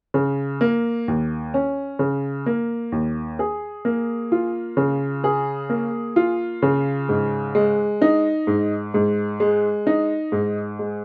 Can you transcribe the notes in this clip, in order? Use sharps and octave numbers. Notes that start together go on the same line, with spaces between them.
C#3
A#3
D#2
C#4
C#3
A#3
D#2
G#4
A#3
F4
C#3
G#4
A#3
F4
C#3
G#2
G#3
D#4
G#2
G#2
G#3
D#4
G#2
G#3